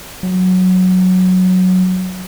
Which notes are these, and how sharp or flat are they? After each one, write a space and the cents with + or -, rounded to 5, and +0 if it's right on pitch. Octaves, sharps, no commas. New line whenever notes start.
F#3 -5